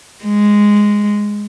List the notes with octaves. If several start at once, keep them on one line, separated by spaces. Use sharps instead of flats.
G#3